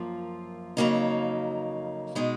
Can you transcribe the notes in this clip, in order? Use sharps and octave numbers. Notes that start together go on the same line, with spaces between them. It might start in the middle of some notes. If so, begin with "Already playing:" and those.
Already playing: F#2 F3 A#3 F4
F2 C#3 F#3 A#3 D#4
B2 G#3 D#4